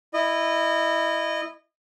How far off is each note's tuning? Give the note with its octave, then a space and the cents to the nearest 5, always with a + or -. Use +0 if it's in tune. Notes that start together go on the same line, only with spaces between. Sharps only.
E4 +0 D#5 -25